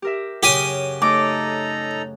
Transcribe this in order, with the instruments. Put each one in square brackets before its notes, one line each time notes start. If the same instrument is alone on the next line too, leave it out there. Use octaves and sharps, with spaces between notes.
[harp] G4 A#4 E5
[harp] F#2 C#3 [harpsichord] G4 G#5 D#6
[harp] A3 [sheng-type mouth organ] D#4 A4 A#5 [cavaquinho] D6